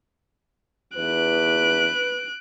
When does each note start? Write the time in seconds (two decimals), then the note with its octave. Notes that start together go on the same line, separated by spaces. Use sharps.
0.96 E2 B4 F#6 D7